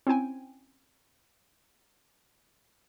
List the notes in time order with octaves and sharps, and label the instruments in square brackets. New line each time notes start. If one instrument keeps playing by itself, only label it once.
[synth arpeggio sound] C4 C#4 E4 G5 G#5